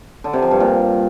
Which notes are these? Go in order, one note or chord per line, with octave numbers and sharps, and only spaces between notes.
D3
C3
F3
G2
A#2